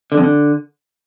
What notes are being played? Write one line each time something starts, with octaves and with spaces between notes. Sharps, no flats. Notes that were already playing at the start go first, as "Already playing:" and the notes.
D3
F2
D3